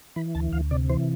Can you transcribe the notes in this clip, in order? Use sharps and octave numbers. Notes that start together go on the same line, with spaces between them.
E3 B5
D2 A5
D2 F5
C3 D5
E3 C5